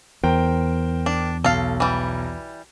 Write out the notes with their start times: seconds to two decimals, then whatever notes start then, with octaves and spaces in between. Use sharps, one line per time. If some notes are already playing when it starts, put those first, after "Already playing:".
0.23 E2 A#4 C5 G5
1.06 D4
1.44 B1 A4 F5
1.80 E3 G3